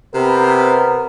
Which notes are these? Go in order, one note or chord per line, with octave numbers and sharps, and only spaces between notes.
C3 B3 A#4 B4